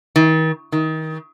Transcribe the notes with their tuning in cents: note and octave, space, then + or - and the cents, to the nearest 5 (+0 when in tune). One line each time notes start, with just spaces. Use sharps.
D#3 +40
D#3 +25